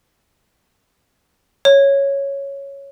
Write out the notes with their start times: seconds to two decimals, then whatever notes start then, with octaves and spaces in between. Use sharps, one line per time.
1.65 C#5